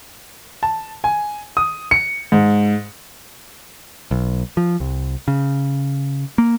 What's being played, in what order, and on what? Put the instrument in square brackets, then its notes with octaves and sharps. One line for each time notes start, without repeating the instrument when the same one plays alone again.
[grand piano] A5
G#5
D#6
C#7
G#2
[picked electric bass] B1
F3
C2
C#3
A#3